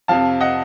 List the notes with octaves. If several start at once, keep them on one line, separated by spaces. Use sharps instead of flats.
F2 C3 F3 F5 A5
D#5 F#5